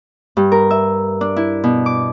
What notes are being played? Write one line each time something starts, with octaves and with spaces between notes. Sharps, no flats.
G2
A#4
E5
D4
E4
B2
D6